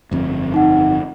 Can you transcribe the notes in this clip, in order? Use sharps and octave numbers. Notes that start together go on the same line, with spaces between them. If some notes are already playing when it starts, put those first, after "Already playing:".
G1 F2 C4
D#4 F#5